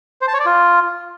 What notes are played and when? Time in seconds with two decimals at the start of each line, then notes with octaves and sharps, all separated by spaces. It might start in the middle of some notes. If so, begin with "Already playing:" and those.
0.22 C5
0.28 A5
0.34 C#5
0.40 D5
0.46 F4